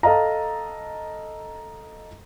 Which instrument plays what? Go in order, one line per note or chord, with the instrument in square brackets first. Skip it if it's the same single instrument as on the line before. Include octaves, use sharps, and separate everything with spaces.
[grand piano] A4 D#5 F5 A#5